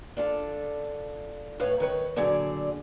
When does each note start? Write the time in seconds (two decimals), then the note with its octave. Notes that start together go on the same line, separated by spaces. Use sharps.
0.17 D4 F4 A4
1.60 A2 B4 C#5 F5
1.80 D#3 B4 C#5
2.16 A#2 D3 F#3 G#4 D5